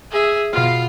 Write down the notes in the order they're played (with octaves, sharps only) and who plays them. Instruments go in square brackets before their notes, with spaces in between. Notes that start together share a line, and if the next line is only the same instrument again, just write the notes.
[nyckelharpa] G#4 E5
[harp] B2 F5 [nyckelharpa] F4